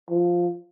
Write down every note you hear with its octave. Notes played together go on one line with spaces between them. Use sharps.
F3